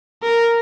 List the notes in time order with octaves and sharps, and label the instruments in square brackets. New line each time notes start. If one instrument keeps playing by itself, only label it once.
[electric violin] A#4